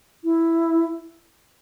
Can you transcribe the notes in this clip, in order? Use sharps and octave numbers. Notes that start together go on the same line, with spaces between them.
E4